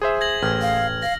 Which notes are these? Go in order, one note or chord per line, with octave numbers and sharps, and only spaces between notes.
G#4 C5 E5
G#6 A#6 F#7
A1 F6 G#6
F5
F5 A#6